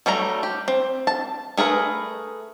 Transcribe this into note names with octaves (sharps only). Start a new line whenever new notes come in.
F#3 G3 A3 A#5
G4
C4
A5
A3 G#4 A#4 B4